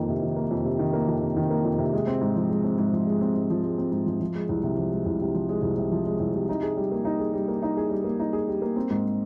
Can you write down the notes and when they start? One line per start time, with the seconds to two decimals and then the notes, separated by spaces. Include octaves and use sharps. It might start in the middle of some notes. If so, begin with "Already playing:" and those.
Already playing: F2 D#3 A#3
0.09 C3
0.22 D#3
0.36 A#3
0.51 F2
0.65 C3
0.79 D#3
0.93 A#3
1.07 F2
1.22 C3
1.36 D#3
1.51 A#3
1.64 F2
1.79 C3
1.93 G#3
2.07 C4
2.21 G#2
2.36 F3
2.50 G#3
2.64 C4
2.78 G#2
2.93 F3
3.07 G#3
3.21 C4
3.35 G#2
3.50 F3
3.63 G#3
3.78 C4
3.92 G#2
4.06 F3
4.20 F3
4.35 G#3
4.49 C2
4.64 C3
4.77 F3
4.92 G#3
5.06 C2
5.21 C3
5.35 F3
5.49 G#3
5.63 C2
5.78 C3
5.92 F3
6.06 G#3
6.20 C2
6.35 C3
6.49 D#4
6.63 G#4
6.77 G3
6.92 A#3
7.05 D#4
7.19 G#4
7.33 G3
7.48 A#3
7.63 D#4
7.77 G#4
7.90 G3
8.04 A#3
8.20 D#4
8.33 G#4
8.48 G3
8.62 A#3
8.76 C4
8.90 G#2